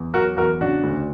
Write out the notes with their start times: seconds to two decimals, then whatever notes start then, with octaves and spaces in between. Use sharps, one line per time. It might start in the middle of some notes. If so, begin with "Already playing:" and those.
Already playing: E2
0.14 F#3 F#4 A#4
0.37 E2 F#4 A#4
0.61 C#3 D4 F#4
0.83 D2